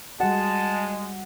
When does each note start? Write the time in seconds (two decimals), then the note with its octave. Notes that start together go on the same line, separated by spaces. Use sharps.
0.20 G3 G#3 F#4 F#5 A5